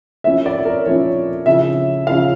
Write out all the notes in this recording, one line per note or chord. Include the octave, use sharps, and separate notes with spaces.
F3 A#3 C#4 E4 E5
D5
C#5
A#4
F3 A#3 C#4 E4 C#5
C#3 F3 C#4 E4 E5
C#3 F3 C#4 E4 F5